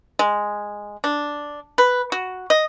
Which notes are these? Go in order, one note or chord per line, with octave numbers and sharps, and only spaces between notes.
G#3
D4
B4
F#4
D#5